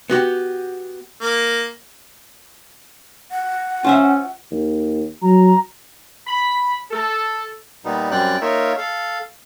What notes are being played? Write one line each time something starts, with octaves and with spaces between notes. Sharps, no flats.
B3 F#4 G4
A#3
F#5
C#4 F4 C5 E5
D#2
F#3 A#5
B5
A4
A#2 G3 B3 D#4
F#2 G3 C4 D5 G5 F#6
A#3 D#4 F4 A#4 C#5 E5
A4 F5